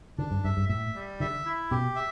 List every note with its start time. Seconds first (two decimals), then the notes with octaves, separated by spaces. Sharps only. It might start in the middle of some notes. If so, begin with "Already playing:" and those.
0.18 D3 D4
0.31 G2
0.44 G2 E5
0.57 G2
0.69 A2 E5
0.95 G3
1.20 D3 E5
1.46 E4
1.71 B2 G4
1.96 E5